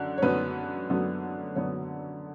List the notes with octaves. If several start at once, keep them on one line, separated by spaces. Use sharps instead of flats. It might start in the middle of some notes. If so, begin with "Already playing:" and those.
Already playing: F#2 D3
C#5
F#2 D3 F#3 B3 B4
F#2 D3 F#3 B3
F#2 D3 F#3 B3 C#5